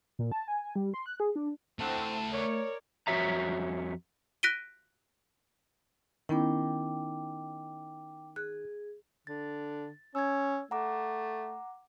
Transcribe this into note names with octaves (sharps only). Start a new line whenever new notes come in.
A#2
A5
G#5
G3
C6
F#6
G#4
D4
A3 C4 E4 F#5 A5
A#4 C#5 D5
F2 F#4 C#5 E5 A#5
F#6 A#6 B6 D7 D#7 G7
D#3 B3 C#4 E4 G5 D6
G#4 F#6
D3 A6
C#4 E6 G#6
A3 F#5 A#5 D6